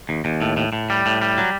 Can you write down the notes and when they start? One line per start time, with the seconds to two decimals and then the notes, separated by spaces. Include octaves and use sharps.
0.09 D#2
0.25 D#2
0.42 A2
0.57 A2
0.73 A2
0.90 G3
1.06 A2
1.22 G3
1.38 F#3